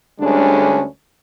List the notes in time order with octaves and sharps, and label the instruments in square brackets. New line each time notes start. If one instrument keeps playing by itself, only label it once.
[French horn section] D2 D3 G3 G#3 C#4 D4